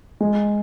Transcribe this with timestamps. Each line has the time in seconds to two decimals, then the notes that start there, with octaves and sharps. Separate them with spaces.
0.21 G#3